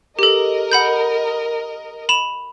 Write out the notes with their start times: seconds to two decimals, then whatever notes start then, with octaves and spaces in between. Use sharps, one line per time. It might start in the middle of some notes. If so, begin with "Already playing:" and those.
0.19 G4 A4 A#4 D#5
0.72 F#5 B5 G6
2.09 B5 E7 F7